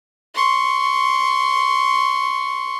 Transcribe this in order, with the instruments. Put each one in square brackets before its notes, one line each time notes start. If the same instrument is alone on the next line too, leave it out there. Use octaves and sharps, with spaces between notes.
[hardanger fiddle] C6 C#6